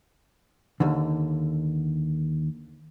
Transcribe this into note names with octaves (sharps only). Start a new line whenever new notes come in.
D#2 D3